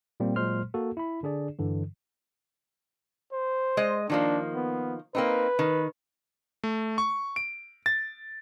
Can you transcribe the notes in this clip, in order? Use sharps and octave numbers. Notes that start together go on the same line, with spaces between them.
A#2 G3 A#3 C4
A#2 F#3 G#3 C5 C6 F6
A#3 F#4 A4
E4 B5
D3 D4 G#4 D5
G2 D3 E3
C5
G#3 D#5
D#3 F3 A#3 D4
B3
A#3 C4 D#4 B4
D#3
A3
C#6
D7
A6